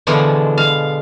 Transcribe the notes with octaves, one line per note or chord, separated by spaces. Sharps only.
B2 D3 E3 F3 G#3
F5